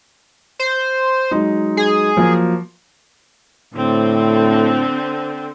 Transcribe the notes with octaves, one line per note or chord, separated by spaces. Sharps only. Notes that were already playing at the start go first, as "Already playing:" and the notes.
C5
F#3 G#3 D#4
G#4
F3 F#3 A#3
A2 D3 C4